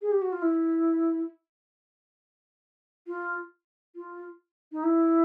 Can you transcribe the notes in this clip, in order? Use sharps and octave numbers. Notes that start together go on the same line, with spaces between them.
G#4
G4
F#4
F4
E4
F4
F4
D#4
E4